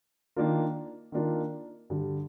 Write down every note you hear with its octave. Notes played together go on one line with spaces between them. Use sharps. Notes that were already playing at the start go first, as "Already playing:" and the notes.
D#3 A#3 D4 F4 A#4
D#3 A#3 D4 F4 A#4
G2 D3 G3